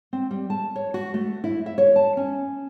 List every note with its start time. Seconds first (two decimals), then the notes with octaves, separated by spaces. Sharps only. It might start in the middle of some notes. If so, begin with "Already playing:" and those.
0.13 C4
0.31 G3
0.50 A5
0.76 C#5
0.94 F#4
1.14 A3
1.44 E4
1.66 E5
1.78 C#5
1.96 A5
2.17 C#4